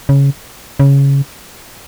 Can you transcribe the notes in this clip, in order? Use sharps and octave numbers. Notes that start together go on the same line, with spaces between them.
C#3
C#3